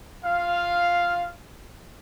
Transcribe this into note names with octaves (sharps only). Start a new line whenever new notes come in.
F4 F5